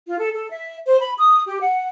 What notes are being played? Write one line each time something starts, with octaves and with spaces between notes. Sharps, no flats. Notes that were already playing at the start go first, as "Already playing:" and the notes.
F4
A4
A4
E5
C5
B5
D#6
G4
F#5